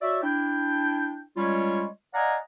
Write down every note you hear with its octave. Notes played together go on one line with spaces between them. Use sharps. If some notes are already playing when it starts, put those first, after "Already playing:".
F#4 C#5 D5 E5
D4 E4 G5
G3 G#3 C#4 F4 C#5
D5 D#5 F5 F#5 G#5 A#5